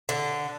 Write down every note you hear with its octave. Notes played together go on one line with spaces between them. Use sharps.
D3